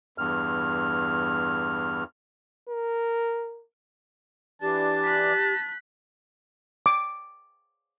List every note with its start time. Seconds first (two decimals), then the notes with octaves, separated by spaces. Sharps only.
0.18 E2 G2 F6
2.69 A#4
4.62 E3 D4 G4 A5
5.04 F#6 B6
6.86 D6